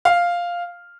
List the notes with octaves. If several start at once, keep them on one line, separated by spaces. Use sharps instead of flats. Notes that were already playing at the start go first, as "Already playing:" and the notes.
F5